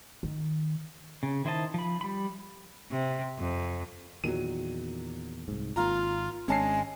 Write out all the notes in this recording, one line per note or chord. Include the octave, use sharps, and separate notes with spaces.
D#3
C#3
D#3 E4 C5 D#5 A5
F3 B5
G3 B5
C3
F2
E2 A#2 D#3 F#3 D#7
C2 G#2
G#1 A#3 F4 A#5
G#1 G#3 C#4 D4 A5 C7